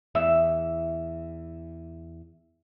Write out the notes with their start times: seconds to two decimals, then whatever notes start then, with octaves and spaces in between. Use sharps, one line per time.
0.15 E2 E5